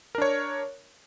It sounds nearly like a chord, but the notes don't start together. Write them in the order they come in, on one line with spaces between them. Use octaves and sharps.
A#4 D4 C#5